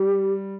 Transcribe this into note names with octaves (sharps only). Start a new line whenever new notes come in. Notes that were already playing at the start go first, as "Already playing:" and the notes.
Already playing: G3 G4